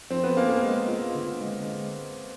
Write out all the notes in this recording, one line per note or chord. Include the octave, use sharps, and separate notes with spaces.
F3 C4
B3
A#3 C#4
A#3
G#3
F4
D3
G#3